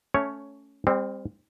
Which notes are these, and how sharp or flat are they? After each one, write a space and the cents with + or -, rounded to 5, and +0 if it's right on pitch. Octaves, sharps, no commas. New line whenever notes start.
A3 +0 C#4 +10 C#5 +0
G3 +40 C4 +0